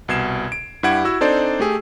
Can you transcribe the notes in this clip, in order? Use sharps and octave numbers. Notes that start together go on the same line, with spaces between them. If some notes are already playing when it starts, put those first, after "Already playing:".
C2 B2 G#6 C7 E7
D7
G2 E4 G4 F#5 G#6 D7
E4 F#4 E6
C4 D4 D#4 A4 C5 D5
A3 G4 G#4